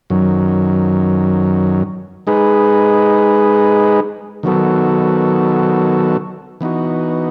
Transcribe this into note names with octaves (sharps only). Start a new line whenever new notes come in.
F#2 D#3 F#3
G#3 D#4 G#4 B4
D#3 F#3 B3 F#4 A4
E3 B3 D#4 F#4